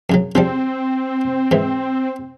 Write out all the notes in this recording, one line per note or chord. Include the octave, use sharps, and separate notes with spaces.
F#2 C#3 F#3
C#3 F3 G3 C4
G#2 E3